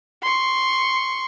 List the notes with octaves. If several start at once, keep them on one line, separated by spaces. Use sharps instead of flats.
C6 C#6